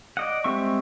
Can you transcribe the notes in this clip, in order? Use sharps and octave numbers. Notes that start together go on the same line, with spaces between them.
D5 D#5 F#5
G3 G#3 C4 E5 C#6